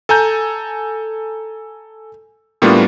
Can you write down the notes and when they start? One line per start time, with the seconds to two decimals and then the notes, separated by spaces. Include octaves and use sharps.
0.09 A4 G#5 A#5 G6
2.62 A2 G3 A#3 B3 D4 F4